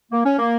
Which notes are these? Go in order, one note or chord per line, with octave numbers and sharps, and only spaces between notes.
A#3
C#4
A#3